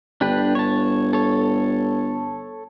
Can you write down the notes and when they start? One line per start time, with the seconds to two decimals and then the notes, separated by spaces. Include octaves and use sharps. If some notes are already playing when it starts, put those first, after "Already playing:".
0.21 G1 D4 G4 B4
0.55 C#5 A5
1.13 A4 C#5